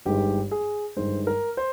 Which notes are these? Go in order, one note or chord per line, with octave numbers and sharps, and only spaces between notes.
G1 G2 D#3 G#3 G4
G#4
G1 G2 D#3 G#3 C5
A#4
C5